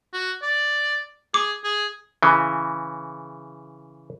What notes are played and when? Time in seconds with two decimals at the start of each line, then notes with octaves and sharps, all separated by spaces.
0.14 F#4
0.43 D5
1.34 G#4 D6
1.64 G#4
2.23 C#3 E3